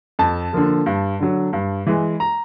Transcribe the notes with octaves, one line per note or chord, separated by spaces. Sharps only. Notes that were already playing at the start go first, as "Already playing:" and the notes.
F2 A5
D3 F3 A#3
G2
D3 F#3
G2
E3 G#3
A#5